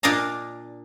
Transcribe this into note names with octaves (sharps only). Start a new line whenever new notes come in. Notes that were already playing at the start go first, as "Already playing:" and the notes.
A#2 D4 D5 D#5 F5 A#5